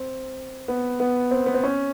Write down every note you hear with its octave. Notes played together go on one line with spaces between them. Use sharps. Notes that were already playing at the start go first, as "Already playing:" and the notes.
Already playing: C4
B3
B3
C4
B3
C4
C#4